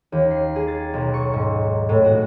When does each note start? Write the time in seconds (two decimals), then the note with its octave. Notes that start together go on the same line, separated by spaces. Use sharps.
0.12 D#2
0.31 C7
0.56 G#4
0.68 A6
0.93 B1
1.14 C#6
1.34 G#2
1.89 A2
2.04 F#4